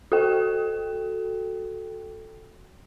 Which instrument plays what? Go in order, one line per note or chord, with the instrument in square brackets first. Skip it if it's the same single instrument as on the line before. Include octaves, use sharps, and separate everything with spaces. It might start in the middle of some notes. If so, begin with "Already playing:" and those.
[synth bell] F#4 A4 G5